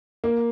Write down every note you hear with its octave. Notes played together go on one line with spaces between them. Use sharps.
A#3